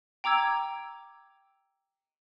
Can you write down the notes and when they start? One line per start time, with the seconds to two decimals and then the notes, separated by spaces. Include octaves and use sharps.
0.24 G5 A#5 D6 E6 G#6